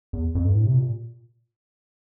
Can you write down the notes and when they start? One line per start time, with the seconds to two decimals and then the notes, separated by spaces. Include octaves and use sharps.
0.13 E2
0.35 F2
0.45 G2
0.55 A2
0.66 C3
0.77 A#2